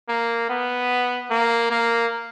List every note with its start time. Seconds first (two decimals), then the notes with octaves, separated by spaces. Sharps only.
0.09 A#3
0.50 B3
1.31 A#3
1.71 A#3